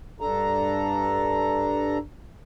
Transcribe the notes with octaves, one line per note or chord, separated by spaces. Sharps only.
G2 D4 A4 A#5